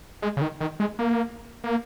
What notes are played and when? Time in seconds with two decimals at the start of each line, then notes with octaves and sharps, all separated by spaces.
0.22 G#3
0.37 C#3
0.41 D#3
0.61 D#3
0.80 G#3
0.99 A#3
1.64 A#3